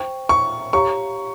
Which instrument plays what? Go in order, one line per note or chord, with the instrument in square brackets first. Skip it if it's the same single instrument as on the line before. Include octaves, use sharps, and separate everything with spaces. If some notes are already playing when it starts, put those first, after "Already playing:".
Already playing: [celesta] C5 G5 C#6
[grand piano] C#6
[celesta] G4 C#5 F5 A#5 [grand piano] C#6